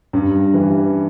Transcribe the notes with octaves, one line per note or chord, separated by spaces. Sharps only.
G2
E3 G3